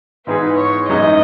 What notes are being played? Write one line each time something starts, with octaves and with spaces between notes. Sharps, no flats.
G#2 E3 B3 D#4 G#4 B4
C#5
F#2 E3 G#3 B3 D#4 D#5